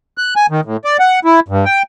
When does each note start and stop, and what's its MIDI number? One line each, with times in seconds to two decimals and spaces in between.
0.18 0.34 90
0.36 0.46 80
0.50 0.61 51
0.65 0.77 45
0.85 0.97 74
1.00 1.20 78
1.25 1.40 64
1.48 1.65 43
1.65 1.83 79